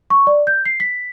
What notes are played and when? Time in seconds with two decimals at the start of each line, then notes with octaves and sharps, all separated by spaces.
0.10 C#6
0.27 D5
0.47 G6
0.65 C7
0.80 B6